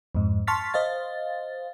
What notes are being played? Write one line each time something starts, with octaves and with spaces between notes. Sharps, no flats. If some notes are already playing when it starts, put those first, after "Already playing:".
F2 G#2
A5 C6 C#6 F6 A6 B6
C5 D#5 F5 A6